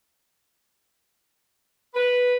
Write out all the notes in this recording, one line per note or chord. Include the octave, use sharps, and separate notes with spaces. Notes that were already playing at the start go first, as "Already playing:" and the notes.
B4